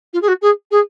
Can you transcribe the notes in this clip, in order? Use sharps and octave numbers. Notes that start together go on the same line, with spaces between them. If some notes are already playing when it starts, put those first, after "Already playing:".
F4
G#4
F#4
G#4
G#4